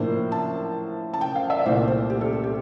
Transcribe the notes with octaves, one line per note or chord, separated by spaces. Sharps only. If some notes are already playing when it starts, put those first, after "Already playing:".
Already playing: A2 F3 A#3 D4 C5
A5
A5
G5
F5
E5
D5
C2 A#2 A3 C5
C5
G4
A4
A4
G4